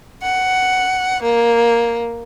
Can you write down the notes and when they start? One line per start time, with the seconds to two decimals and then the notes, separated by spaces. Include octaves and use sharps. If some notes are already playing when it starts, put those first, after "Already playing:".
0.22 F#5
1.22 A#3